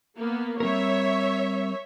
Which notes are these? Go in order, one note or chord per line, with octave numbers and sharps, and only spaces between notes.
A#3 B3
G3 C4 A#4 C#5 E5